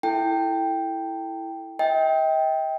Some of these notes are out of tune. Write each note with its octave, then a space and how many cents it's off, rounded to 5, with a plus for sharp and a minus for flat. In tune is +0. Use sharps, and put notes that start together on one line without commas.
E4 +0 A4 +0 G5 +0
D#5 +40 G5 +0